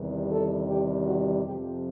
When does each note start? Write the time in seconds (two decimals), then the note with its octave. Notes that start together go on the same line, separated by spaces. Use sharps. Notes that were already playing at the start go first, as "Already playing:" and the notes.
Already playing: E2 C3 D#3 G3
0.30 A4
0.68 G4
1.05 F#4
1.44 F2 C3 F3 G4